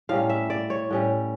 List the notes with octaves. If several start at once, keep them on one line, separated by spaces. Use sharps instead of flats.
A2 G3 C#4 F5
E5
D5
C#5
A2 G3 C#4